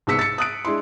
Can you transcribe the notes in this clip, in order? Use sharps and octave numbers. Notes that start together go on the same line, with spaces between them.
C2 G#2 B3 E6 B6 C#7
A6 C#7
D#6 F#6 D7
G#3 D4 E4 C6